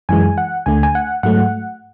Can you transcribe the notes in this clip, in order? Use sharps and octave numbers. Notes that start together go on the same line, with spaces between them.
F#2 E3 G#3 G#5
F#5
D2 D3 A3 G#5
G#5
F#5
G#2 F#3 A3 F#5